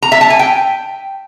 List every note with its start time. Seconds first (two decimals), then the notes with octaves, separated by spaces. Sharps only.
0.02 A#5
0.12 E5
0.21 A5
0.30 G#5
0.39 G5